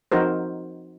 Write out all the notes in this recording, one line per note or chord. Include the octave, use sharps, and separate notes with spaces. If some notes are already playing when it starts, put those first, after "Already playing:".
F3 C4 D#4 F#4 A#4 C5